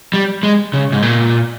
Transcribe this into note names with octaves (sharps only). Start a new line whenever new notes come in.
G3
G#3
C#3
G#2
A#2